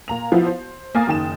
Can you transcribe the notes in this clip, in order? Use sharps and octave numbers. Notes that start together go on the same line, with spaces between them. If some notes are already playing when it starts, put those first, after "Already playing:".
A#2 A#5 F7
F3 B3 E4 F#4
C5
A#3 A#4 F5 G#5 D#6 A6
F#1 D#3 G5 E7